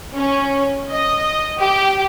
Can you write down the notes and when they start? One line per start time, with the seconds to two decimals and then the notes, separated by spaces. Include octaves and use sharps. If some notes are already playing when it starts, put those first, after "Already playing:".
0.16 C#4
0.91 D#5
1.60 G4